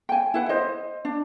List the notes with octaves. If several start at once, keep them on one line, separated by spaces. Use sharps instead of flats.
G5 G#5
E4 B4 F#5
C5 D#5
D4